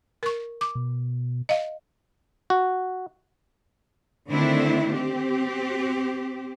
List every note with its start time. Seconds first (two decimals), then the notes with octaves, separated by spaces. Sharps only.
0.23 A#4 C#6
0.61 D6
0.75 B2
1.49 D#5 F5
2.50 F#4
4.29 D3 D#3 A3 C4 D4 E4
4.95 C4 G4